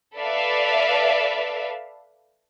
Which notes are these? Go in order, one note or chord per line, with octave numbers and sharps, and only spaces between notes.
A4 B4 D5 E5 F5